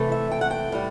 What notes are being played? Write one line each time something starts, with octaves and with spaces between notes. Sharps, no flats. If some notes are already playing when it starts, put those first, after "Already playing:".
Already playing: C3 E3 A3
E5
G5
F#5
G5
A2 G3